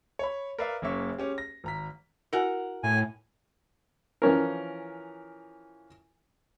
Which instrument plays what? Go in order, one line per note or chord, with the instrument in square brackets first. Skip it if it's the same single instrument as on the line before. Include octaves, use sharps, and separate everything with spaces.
[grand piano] C#5 B5
A#4 B4 D5 E5 F5
F#1 C#3 A#3 C#4 E5 C#6
G#3 C#4 G4
A#6
G#1 A#5 B6
[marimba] E4 F#4 G#5 [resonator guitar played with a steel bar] A#4 F#5
[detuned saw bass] A2 [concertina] G#5
[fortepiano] E3 F3 C#4 A#4